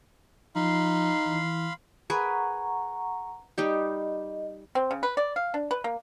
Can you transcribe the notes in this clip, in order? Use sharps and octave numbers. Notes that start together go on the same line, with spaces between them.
F3 D#4 F5 B5 C6
E3
G#4 A#4 B4 F#5 A#5 C#6
G3 D#4 G4 D#5
C4
C#3
B4
D5
F5
D4
B4
A#3